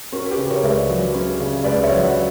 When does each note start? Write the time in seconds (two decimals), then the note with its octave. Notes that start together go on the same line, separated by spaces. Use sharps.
0.12 C#4 F#4 A#4
0.31 G4 B4
0.37 C#3
0.50 A#4 C#5
0.63 C#2 E5
0.69 B4 D5
0.89 F#3
1.14 C#4
1.40 C#3
1.64 C#2 B4 D5
1.83 C#5 E5
1.90 F#3
2.02 D5 F#5